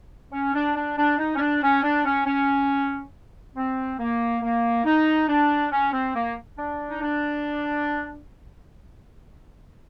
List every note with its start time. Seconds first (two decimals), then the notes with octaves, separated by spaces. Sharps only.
0.32 C#4
0.54 D4
0.75 D4
0.97 D4
1.18 D#4
1.36 C#4
1.40 D4
1.62 C#4
1.83 D4
2.05 C#4
2.26 C#4
3.55 C4
3.99 A#3
4.42 A#3
4.85 D#4
5.28 D4
5.71 C#4
5.93 C4
6.15 A#3
6.58 D4
6.89 D#4
7.01 D4